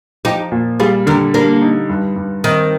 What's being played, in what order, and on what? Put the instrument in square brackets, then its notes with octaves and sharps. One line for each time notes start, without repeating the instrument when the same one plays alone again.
[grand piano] F3 [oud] D#4 G4
[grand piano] A#2
[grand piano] G3 [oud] F4 G#4
[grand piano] D3 [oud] G4 A#4
[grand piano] G3 [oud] A#3 D4
[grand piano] D#4
G2
G2
[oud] D#3 [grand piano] C4